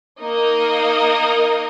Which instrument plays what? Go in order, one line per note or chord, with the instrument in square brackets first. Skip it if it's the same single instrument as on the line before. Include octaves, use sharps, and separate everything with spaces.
[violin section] A#3 D#4 A#4 D#5